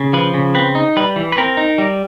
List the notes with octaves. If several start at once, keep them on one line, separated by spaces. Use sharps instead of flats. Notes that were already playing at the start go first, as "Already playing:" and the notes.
Already playing: C#3
F3 B4
C#3
C4 B4
D#4
G3 B4
E3
B4
C4 A#4
D#4
G3